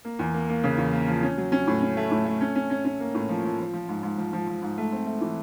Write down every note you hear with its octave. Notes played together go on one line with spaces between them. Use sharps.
A#3
E2
A#3
A#3
C#3
E2
A#3
F3
C#4
F#3
C#4
A2
C#4
A3
A2
A3
C#4
C#4
C#4
C#4
A#3
A2
F3
F3
F3
F3
G#2
G#2
F3
F3
F3
G#2
A3
C4
A3
E3